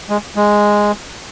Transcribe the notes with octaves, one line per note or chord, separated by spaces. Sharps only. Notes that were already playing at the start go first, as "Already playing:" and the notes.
G#3
G#3